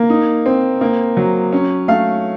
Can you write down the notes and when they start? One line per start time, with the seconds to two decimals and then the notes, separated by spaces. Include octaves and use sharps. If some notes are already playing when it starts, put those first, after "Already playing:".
Already playing: A#3
0.10 D#4
0.46 C4
0.81 A#3
1.17 F#3
1.53 C#4
1.88 A3 F5